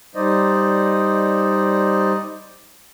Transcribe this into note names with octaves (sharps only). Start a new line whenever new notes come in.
G3 D#4 C5 D5 D#5